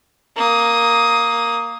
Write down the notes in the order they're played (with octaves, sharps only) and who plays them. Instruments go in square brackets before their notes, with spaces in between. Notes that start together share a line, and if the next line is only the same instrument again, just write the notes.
[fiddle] A#3 D#6